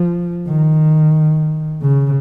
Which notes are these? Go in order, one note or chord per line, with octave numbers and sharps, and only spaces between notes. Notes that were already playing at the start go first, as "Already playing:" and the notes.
Already playing: F3
D#3
C#3